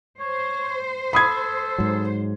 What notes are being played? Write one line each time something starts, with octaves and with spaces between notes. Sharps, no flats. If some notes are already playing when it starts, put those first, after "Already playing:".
C5 C#5
A4 B5 D#6 G#6
G#2 F#3